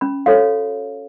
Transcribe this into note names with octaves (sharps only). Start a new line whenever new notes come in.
C#4 B5
F#4 A4 C#5 F5